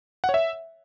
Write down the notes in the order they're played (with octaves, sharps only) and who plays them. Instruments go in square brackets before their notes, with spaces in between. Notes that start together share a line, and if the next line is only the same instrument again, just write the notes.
[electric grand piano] F#5
C#5
E5